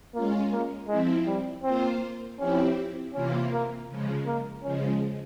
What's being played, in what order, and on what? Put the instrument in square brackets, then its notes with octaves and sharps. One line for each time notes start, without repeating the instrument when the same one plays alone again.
[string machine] G#3 C#4 F4 [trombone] A#3
[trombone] A#3
[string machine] F3 C4 E4 [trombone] G#3
[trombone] G3
[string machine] A#3 F4 C5 [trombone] C4
[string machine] F3 C4 E4 G4 [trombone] C#4
[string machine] C3 E3 A#3 F4 [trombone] C#4
[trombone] A#3
[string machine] C#3 F3 G#3
[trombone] A#3
[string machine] C#3 F3 G#3 [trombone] C#4